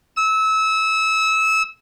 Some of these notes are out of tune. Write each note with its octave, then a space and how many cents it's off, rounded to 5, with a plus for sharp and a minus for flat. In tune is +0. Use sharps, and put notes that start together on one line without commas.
E6 -25